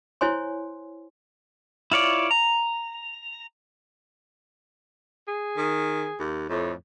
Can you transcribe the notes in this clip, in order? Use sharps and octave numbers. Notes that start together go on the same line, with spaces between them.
E4 C5 C#5 G#5 C6
E4 F4 C#5 D5
A#5
G#4
D#3
D#2
F2 A2